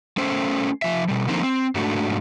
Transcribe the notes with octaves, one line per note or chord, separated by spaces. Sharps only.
A3 C#4 C5
F3 E5
B2 G3
D3 F3 A#3 C4 D#4 C5
C4
G#2 A3 D4 F#4